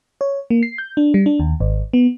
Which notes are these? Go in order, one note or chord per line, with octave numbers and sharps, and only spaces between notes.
C#5
A#3
C7
G6
D4
G3
D4
D#2
G#1
B3